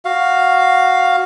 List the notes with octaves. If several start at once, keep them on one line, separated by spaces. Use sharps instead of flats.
F#4 F5